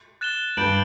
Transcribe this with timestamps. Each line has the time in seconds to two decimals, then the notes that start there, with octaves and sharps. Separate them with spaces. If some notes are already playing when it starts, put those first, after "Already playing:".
0.21 F#6 A6 E7 G7
0.57 G2 G6 D7 F#7